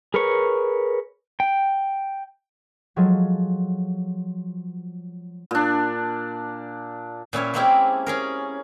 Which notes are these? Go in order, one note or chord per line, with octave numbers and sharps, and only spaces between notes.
G#4 A#4 B4 C#5 C#6
G5
F3 F#3 G#3 G#4 A4
A#2 D4
A#2 C#4 E4 C#5
G#3 A#3 C4 C#4 E4 G4
C#4 G#4 A#4